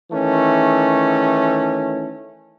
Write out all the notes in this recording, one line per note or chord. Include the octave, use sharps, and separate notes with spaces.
D#3 E3 A3 C#4